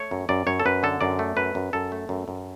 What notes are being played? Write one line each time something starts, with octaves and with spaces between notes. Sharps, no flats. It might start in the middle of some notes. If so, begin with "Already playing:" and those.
Already playing: A3 C#5
F#2
F#2 D5
F#2 C#5
A4
F#2 B4
D3 A4
F#2 D5
A3
F#2 B4
F#2
F#2 A4
A3
F#2
F#2